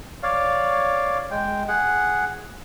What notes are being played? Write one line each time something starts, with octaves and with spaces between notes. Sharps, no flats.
C#5 D5 F5
G#3 G5
G#4 F#5